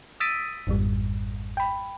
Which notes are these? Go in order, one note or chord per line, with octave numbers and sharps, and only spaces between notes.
D#6 E6 A6 B6 D7 D#7
G#1 F2 G#2 G3
G5 B5